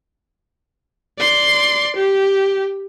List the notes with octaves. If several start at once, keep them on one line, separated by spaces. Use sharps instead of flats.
D5 C6
G4